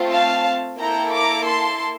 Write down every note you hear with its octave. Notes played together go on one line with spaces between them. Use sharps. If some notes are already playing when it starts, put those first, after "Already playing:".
Already playing: A3 C4 F4
F5 A5
A#3 E4 A4 G5 A#5
A#5 D6
A5 C6